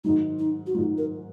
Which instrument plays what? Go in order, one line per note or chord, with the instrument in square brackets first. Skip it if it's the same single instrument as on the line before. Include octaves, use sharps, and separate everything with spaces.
[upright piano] G#2 D#3 F#3 [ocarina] D#4
[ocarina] D#4
F#4
[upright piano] G#2 D#3 F#3 [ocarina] F4
[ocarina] A#4